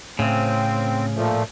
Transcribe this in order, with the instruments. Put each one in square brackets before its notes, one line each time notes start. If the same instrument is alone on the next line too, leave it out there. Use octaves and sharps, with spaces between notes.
[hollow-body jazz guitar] A2 [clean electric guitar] C#3 [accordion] C4
[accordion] A#2 F3 A3